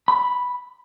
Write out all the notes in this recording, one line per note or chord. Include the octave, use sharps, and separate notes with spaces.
B5